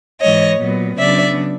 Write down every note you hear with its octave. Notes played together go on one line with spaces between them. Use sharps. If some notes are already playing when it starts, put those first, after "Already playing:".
G#2 E3 G#3 C#5 D#5
A#2 F#3 B3
C#3 F#3 B3 D4 D5 E5